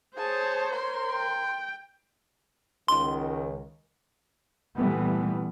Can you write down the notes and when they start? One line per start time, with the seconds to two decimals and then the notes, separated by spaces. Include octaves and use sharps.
0.17 G#4 C5 C#5 A5
0.72 A#4 C6
1.11 G5
2.88 C#2 D#3 C6
4.76 A#2 E3 G3 A3 B3